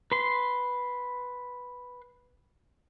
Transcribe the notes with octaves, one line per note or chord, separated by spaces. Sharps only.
B4 C6